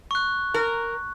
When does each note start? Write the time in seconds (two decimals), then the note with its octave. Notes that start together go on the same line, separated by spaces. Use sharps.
0.11 C#6 F#6
0.54 A#4